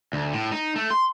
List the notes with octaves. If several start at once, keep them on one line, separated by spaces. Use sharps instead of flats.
D2
A2
D#4
A3
C6